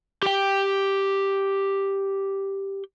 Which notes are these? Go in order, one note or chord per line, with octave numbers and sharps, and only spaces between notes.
G4 G5